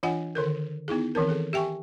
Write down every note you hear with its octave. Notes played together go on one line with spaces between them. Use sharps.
E3 D4 F4 D#5 F#5 G#5
D3 D#3 A4 A#4
B3 D#4 E4 G#4
D#3 E3 C4 A#4
G#4 A4
G4 E5 G5 G#5 C#6